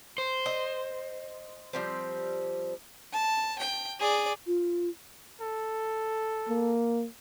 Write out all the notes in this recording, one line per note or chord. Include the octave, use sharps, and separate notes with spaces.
C5
D#5
F3 G3 C4
A5
G5
G#4 D5
F4
A4
A#3